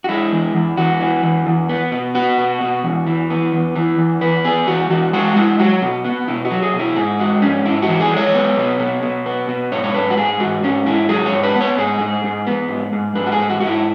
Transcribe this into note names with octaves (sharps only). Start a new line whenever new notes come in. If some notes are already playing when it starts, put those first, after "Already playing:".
F#4
G#3 E4
E2
E2
E2 F#4
E3
E2
E2
B3
B2
B3 F#4
B2
B2
E2
E3
B3
E2
E3
E2
E2 B4
B3 G#4
E2 F#4
E2 F#4
G#3 F#4
G#3 E4
F#3 F#4
B2
B3
B2 E4
F#4
F#3
G#4
B2
E4
G#2 G#4
G#3 F#4
G#2 C#4
G#2 E4
F#4
E3
G#4
G#3 C#5
B3
B2
B2
B2
B3
B2
G#2 C#5
C#5
G#2 B4
F#4
G#2 G#4
G#2 F#4
G#2 C#4
G#2 E4
F#3 G#4
C#5
G#2
B4
B3
C#5
G#2 G#4
G#2
G#2
B3
G#2
G#2
G#2 B4
F#4
G#4
G#2
F#4
G#2 F#4
E4